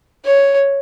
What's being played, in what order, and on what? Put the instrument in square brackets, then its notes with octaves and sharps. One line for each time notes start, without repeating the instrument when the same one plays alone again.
[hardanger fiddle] C#5